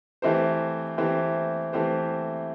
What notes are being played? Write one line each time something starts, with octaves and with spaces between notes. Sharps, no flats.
E3 A3 C4 G4 C5
E3 A3 C4 G4 C5
E3 A3 C4 G4 C5